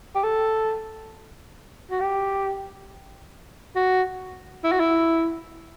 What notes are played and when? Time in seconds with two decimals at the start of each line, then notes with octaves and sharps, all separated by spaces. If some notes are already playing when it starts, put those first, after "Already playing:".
0.15 G4
0.24 A4
1.90 F#4
2.00 G4
3.75 F#4
4.64 E4
4.72 F#4
4.80 E4